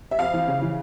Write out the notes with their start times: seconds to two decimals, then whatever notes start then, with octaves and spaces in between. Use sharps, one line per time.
0.11 E5
0.19 F2 F5
0.34 E3
0.48 C#3
0.62 E3